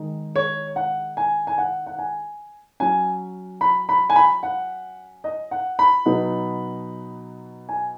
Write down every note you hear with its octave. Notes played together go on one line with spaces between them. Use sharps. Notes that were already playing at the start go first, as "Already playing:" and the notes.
Already playing: D#3 G#3 D#4
C#5
F#5
G#5
G#5
F#5
F#5
G#5
F#3 C#4 G#5
B5
B5
G#5
B5
F#5
D#5
F#5
B5
B2 F#3 B3 D#4
G#5